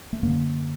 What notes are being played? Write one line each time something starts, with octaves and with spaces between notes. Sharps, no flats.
A3
F#2 D3 A#3